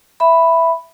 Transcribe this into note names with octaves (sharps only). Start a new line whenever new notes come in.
E5 B5